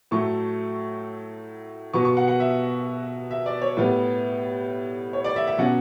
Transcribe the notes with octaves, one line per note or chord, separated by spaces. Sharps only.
A2 F#3 A3 C#6
B2 F#3 B3 C#6
C#6
F#5
F#5
E5
E5
D5
C#5
A2 G3 B3
C#5
D5
E5
E5
B2 F#3 C#4 F#5